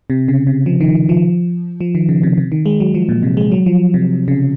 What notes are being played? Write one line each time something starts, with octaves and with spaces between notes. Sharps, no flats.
C3
C#3
C3
F3
D#3
D#3
F3
F3
D#3
C#3
C3
C3
D#3
G#3
F#3
F3
A#2
C3
G#3
F#3
F3
C3
C#3